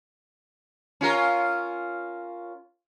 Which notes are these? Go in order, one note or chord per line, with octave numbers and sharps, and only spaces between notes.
C#4 F4 A#4